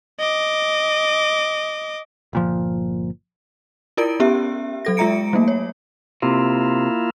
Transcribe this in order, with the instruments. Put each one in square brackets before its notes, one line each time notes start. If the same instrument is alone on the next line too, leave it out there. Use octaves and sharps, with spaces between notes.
[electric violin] D#5 D6
[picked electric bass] G1 A#2 F3
[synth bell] E4 F4 A#4 D5 D7
B3 C#4 G4 E5
F#3 A4 A#6
G#3 F4 E5 A#5 C#7 D7
F#3 A3 A#3
C#5
[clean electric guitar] C3 [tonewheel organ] A#3 E4 F4